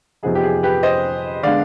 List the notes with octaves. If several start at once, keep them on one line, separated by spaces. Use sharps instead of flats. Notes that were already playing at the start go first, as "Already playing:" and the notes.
F2 C3 F3 B3 D#4 G#4
G4
G#4
G4 B4
C5 D#5
D3 G#3 B3 D4 D5 F5